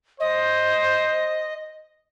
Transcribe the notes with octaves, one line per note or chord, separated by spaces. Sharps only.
C5 D#5